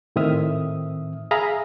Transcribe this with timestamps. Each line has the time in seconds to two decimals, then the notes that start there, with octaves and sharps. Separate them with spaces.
0.16 A2 D#3 C4 E5 D#6 F6
1.31 G#4 E5 F5 A#5 B5 D#6